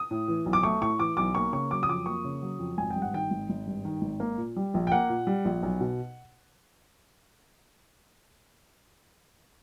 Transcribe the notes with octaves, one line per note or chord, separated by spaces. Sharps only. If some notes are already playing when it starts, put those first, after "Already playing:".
Already playing: D#6
A2
E3
B1
D6
A3 C#6
A2 C#6
E3 D6
B1 D6
A#3 C#6
C#3 C#6
F#3 D6
D#6
F2 D6
A#3 C#6
C#3
F#3
F2
G#1 G#5
G5
G2
F#5
D#3 G5
G#1
G#1
G2
D#3
G#1
A#3
A#2
G3
A#1
G5
A#3 F#5
A#2
G3
A#1
B1
B2